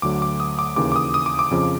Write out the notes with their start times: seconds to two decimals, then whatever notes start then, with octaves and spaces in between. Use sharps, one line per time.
0.02 D2 D3 F#3 D6
0.22 D6
0.40 D#6
0.59 D6
0.76 D#2 C#3 E3 D6
0.92 D6
0.96 D#6
1.14 D#6
1.26 D6
1.39 D6
1.51 F2 C#3 F3